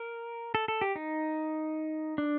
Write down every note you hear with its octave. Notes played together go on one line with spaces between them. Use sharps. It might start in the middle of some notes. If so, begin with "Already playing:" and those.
Already playing: A#4
A4
A4
G4
D#4
D4